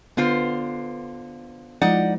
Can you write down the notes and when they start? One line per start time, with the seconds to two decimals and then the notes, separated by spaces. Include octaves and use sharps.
0.17 D3 B3 F4 C5
1.82 F3 G#3 D#4 E4 D5 F#5